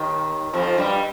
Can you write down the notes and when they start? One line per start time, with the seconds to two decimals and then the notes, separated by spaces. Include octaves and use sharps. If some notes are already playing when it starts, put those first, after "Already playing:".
Already playing: D#2 D#3
0.53 F2 F3
0.78 G2 G3